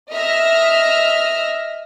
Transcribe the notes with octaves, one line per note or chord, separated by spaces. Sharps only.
D#5 E5 F6 A#6